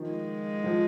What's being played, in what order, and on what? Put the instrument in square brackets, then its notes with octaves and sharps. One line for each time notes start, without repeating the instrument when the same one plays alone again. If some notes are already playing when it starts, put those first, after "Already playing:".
Already playing: [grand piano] D#3 F3
[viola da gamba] G#3
[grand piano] F3